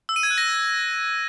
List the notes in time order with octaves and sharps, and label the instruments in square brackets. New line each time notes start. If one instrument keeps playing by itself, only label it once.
[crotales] E6
D#7
G#6
F#6
A#6